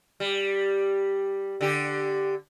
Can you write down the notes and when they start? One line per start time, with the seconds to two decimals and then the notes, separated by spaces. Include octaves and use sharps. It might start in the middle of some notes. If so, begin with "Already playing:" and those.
0.20 G3
1.61 D3 G4